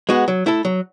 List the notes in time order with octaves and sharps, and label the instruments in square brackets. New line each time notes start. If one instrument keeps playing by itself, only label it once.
[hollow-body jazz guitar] G#3 B3 F#4
F#3
A3 E4 A4
F#3